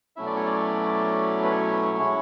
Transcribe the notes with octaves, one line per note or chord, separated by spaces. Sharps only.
B2 F#3 A3 C#4 E4 E5
D5
C#5
D5
B4
C#5
G#3 C#4 E4